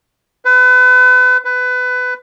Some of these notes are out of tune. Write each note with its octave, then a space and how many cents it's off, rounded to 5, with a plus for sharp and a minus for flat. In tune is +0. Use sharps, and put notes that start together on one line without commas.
B4 +35
B4 +20